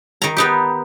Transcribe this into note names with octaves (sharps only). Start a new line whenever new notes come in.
D#3 A#5
B3 D#4 G4